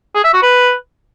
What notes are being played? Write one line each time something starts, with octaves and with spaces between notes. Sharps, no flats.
G#4
E5
F#4
B4